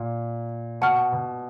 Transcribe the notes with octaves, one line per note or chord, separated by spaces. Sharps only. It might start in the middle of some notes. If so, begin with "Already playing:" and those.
Already playing: A#2
B2 F#5 A5 C#6 F6
B2